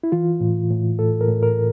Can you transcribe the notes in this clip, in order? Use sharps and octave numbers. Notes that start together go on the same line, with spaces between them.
E4
E3 F4
A2
A2
A2 A4
A#4
A2
A#4